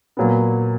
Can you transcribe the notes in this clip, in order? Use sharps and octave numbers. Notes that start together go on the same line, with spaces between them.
A#2 F#3 B3